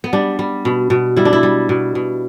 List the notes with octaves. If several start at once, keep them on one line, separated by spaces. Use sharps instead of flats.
B3
G3 D4
G3
B2
B2
G3 E4
D4
E4
G3
B2
B2